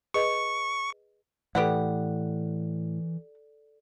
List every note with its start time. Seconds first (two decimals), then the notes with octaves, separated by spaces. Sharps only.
0.14 G#4 B4 D#5 C#6
1.55 A2 E3 G4 A4 B4 D5 F#5